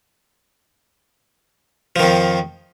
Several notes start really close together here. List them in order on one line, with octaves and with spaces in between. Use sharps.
F3 D#3 F2